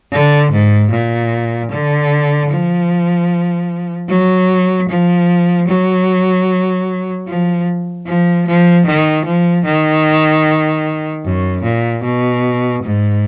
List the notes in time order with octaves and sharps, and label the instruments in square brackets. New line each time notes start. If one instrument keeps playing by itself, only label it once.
[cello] D3
G#2
A#2
D3
F3
F#3
F3
F#3
F3
F3
F3
D#3
F3
D#3
F#2
A#2
B2
G#2